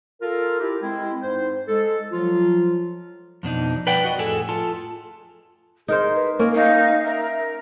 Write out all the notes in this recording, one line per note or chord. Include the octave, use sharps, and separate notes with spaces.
F4 A4 A#4
E4 G4
G#3 C4 E4
G#2 C5
G#3 A4
F3 F#3 F4
F2 B2 D4 D#4
B4 D5 F#5 G5
F#4 D#5
F2 A2 G#4 A4 G#5
F4 A4 A5
D#4 G#4 A#4 C5
B4
A#3 C#4 A#4
D#4 F5
A#4 E5